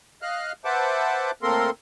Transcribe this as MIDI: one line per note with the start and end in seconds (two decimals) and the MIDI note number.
0.22 0.52 75
0.22 0.52 77
0.22 0.52 89
0.22 0.52 90
0.65 1.31 71
0.65 1.31 72
0.65 1.31 76
0.65 1.31 78
0.65 1.31 81
0.65 1.31 86
1.42 1.70 45
1.42 1.70 58
1.42 1.70 60
1.42 1.70 69
1.42 1.70 70
1.42 1.70 84